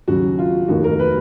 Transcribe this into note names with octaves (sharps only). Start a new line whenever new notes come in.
D#2 C#3 F#3 F#4
F4
F1 D#2 D#3 A#3 F#4
A#4
B4